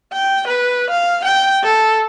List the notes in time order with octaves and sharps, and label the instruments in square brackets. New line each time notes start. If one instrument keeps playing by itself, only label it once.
[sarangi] G5
B4
F5
G5
A4